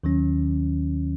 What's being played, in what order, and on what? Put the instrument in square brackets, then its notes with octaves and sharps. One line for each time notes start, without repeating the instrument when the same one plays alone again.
[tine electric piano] D#2 D#3 F#3 C#4